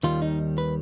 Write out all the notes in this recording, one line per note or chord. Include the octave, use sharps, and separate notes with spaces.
D#2 D#3 G3 F4
D#4
B4